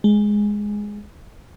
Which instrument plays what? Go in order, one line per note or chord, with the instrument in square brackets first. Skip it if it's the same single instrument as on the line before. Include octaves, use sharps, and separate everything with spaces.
[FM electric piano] G#3